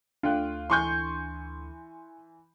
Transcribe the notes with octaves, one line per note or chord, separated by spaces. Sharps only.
D2 D3 F4 G5 F#6
E3 G#5 C6 C#6 G6